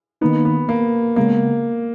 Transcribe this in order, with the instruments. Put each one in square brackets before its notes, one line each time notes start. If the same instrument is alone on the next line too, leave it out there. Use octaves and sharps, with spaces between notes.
[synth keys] D#3 A#3 D#4 [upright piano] B3
[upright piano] B3
A#3
[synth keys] C#3 G#3 B3 [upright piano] A#3